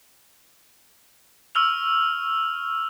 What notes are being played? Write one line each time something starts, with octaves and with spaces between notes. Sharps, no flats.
C#6 E6 F6 F7